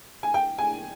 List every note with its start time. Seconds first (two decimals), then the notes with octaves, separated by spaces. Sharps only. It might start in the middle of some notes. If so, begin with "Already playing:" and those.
0.23 G#5
0.34 G5
0.58 G#5